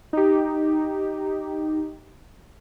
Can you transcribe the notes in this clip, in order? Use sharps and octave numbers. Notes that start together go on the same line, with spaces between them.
D#4 G4